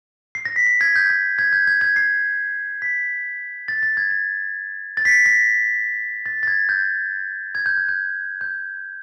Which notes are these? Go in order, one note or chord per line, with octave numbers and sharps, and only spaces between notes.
C7
A#6
B6
C7
G#6
G6
G#6
G#6
G6
G#6
G#6
C7
B6
A6
A6
G#6
G#6
A6
B6
A#6
A#6
A6
A6
G#6
G6
G#6
G6
F#6
G6
G6